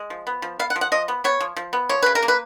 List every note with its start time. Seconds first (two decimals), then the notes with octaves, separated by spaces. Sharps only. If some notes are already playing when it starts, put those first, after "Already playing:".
Already playing: G#3
0.10 F3
0.27 B3
0.42 F3
0.59 B3 F5
0.70 F#5
0.76 F3
0.81 F#5
0.92 F3 D#5
1.08 B3
1.24 B3 C#5
1.40 F3
1.56 F3
1.73 B3
1.89 F3 C#5
2.02 C#3 B4
2.15 A#4
2.23 A#3
2.28 B4